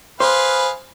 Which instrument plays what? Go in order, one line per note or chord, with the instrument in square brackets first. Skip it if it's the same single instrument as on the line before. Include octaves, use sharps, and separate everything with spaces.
[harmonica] G#4 B4 F5 [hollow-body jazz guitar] C5